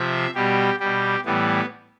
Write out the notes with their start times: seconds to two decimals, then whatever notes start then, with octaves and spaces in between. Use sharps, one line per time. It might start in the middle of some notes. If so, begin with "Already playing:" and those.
Already playing: C3 F3 E5
0.35 B2 G3 G4
0.80 B2 G3 G4
1.25 A2 E3 G3 B3